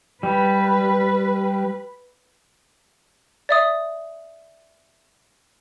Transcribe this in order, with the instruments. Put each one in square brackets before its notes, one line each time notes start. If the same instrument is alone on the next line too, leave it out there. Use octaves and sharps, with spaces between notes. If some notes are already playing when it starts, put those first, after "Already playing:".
[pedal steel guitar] G3 [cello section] B4
[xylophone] D5 E5 D#6